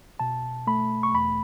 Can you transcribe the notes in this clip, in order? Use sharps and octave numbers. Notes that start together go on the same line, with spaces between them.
B2 A5
A3 B5
C#6
E2 B5